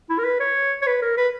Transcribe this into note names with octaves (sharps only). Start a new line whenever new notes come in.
E4
A#4
B4
C#5
C#5
B4
A#4
B4